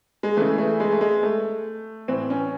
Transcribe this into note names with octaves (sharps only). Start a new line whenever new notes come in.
G#3
C#3 E3 A3
A3
G#3
A3
G#3
A3
A2 E3 C4
C#4